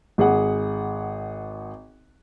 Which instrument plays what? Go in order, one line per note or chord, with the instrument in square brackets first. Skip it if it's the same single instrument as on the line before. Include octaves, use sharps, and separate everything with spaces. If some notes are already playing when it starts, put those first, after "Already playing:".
[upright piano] G#1 G#4 F#5